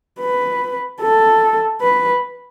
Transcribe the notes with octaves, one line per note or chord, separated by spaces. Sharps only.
B4
A4
B4